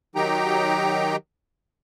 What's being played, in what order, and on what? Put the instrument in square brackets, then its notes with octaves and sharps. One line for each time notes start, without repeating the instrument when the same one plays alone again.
[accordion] D#3 F#3 D#4 G4 G5 A#5